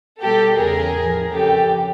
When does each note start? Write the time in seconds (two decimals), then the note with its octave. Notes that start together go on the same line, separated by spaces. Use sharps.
0.23 B2 G3 G4 A4
0.59 E2 C#3 E3 G#4 A#4
0.97 A2 F3
1.34 F2 C#3 F3 G4 A4